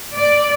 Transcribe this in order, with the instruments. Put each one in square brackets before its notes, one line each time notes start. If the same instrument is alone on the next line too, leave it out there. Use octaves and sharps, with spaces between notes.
[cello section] D5